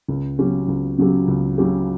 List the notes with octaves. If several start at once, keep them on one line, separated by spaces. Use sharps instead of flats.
C#2
C#3 F#3 C#4 G4
C#2
C#3 F#3 C#4 G4
C#2
C#3 F#3 C#4 G4